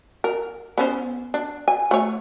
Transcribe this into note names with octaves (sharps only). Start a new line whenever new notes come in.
A#4
B3 C#4 C5
D4
G#5
A3 C#5